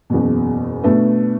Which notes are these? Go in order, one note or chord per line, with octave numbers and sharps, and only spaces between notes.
F#1 E2 B2
B2 A3 D4 B4